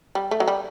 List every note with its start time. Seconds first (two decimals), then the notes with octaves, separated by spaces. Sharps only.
0.15 G3
0.31 A3
0.40 F#3
0.48 G3